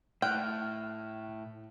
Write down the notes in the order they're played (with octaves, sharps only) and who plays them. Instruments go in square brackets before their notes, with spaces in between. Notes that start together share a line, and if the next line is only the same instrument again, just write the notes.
[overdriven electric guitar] A2 [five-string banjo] G5 [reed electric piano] F6 F#6